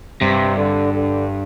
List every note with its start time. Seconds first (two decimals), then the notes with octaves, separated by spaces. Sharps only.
0.21 G2 C3
0.57 D3
0.93 D3